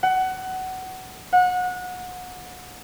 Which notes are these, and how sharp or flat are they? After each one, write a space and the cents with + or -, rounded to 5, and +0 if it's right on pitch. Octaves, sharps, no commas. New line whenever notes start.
F#5 +20
F#5 -25